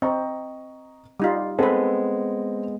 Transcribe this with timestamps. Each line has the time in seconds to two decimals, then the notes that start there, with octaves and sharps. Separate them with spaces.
0.02 C4 D#5 A#5 C#6
1.20 G3 D#4 F4
1.59 G#3 B3 C4 A4 B4